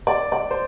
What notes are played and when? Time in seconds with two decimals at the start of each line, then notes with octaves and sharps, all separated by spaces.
0.07 D5
0.32 D5
0.51 C5